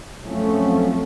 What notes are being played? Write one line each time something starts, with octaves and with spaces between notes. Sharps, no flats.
F#2 F3 F#3 A3 C4 C#4